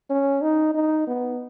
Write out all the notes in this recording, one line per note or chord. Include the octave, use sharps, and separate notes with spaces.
C#4
D#4
D#4
B3